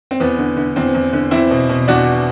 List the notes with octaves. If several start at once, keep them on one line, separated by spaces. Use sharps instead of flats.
C4
E2 B3
D3
D3
E2 C4
E2
D3
E2 C4 E4
B2
B2
E2 D4 F#4